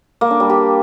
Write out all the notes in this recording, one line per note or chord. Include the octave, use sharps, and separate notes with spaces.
A#3
D4
G3
G4